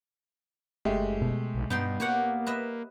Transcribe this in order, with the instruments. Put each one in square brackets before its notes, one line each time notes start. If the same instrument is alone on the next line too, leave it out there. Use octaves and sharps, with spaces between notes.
[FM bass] F#1 [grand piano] G#3 A3 G4
[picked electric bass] B2
[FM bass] B1
[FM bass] G2 [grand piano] B3 [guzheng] D#4 G5 C6
[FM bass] A#3 [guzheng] G4 C#5 F#5
[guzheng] B4 D#5 E5